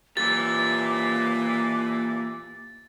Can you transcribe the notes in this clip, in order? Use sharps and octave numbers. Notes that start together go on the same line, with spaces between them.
A#2 E3 A#3 F4 G4 D6 A6